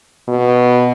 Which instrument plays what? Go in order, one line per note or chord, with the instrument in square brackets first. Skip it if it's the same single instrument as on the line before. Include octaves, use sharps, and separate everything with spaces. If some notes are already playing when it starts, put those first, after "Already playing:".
[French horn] B2